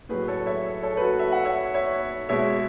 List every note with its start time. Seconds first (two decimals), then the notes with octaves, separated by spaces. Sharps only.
0.09 A2 F#3 G#4 B4
0.28 A4 C#5
0.46 C#5 E5
0.83 A4 C#5
0.97 B4
1.01 F#4 A4
1.19 E5
1.32 F#5
1.45 C#5 E5
1.74 C#5 E5
2.29 B2 G#3 C#5 E5